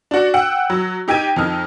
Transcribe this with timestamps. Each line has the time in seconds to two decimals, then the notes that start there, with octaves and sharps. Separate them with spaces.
0.11 D4 F#4
0.34 F#5 G5 E6 F#6
0.70 F#3
1.08 D#4 G4 G5 G#6 D#7
1.36 F2 D#4 F6